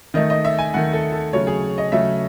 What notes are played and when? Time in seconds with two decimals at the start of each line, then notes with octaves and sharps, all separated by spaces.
0.14 D#3 A3 D#5
0.30 D#5
0.45 E5
0.59 G#5
0.74 D#3 A3 F#5
0.93 A4
1.13 A4
1.33 C#3 F#3 A3 C#5
1.47 G#4
1.78 D#5
1.92 C#3 F#3 A3 E5